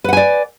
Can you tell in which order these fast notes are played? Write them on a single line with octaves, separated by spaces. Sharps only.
B4 F#5 G#5 D5